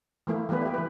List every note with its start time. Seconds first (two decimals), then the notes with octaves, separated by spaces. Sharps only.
0.27 E3 A3 A#3 E4
0.49 E3 G3 A#3 B3 B4
0.62 E4 G4
0.74 E3 B4